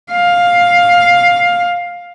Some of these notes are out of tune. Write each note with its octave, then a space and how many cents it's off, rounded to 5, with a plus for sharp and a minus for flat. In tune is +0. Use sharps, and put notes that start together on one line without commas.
F5 +10